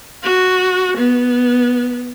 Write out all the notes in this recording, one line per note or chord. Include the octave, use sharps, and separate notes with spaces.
F#4
B3